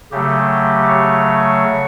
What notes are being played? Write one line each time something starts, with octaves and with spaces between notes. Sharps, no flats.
C#3 F#3 A3 G4
C#5